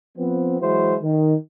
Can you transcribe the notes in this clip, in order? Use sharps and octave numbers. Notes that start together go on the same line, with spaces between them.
F3 B3 C4
E3 F#3 G#3 E4 F#4 C5
D#3